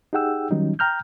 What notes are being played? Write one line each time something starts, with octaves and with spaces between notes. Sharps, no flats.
D#4 G4 G#4 F#5 G5 E6
D#3 F#3 G3 C#4 D#4
G5 A#5 F6 G6